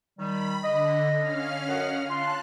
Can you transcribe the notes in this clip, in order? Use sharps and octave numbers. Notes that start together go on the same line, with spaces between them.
D#3 G3 B5
D3 D#5
C#4 F5 F6
F#2 D#5 F#5
F4 A5 C6 F#6